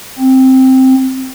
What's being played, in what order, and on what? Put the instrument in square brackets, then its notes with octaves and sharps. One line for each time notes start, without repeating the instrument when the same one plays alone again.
[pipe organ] C4